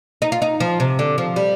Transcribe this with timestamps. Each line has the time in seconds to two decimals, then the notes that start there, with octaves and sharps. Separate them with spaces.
0.22 D#4
0.32 F4
0.42 D#4
0.60 F3
0.80 C3
0.99 D3
1.18 F3
1.36 G3